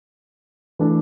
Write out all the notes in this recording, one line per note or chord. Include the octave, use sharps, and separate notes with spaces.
E3 A3 D4 A4